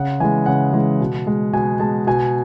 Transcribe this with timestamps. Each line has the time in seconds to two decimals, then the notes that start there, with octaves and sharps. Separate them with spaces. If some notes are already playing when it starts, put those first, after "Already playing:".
Already playing: C#3 F#5
0.20 E3 G#3 G#5
0.46 C#3 F#5
0.73 E3 G#3
1.00 B2
1.27 G#3
1.53 B2 G#5
1.80 G#3 A5
2.07 B2 G#5